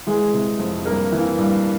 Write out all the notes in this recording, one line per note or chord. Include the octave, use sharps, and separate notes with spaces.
E3 G#3 G#4
C3
F2
G2 A#3 A#4
E3
G2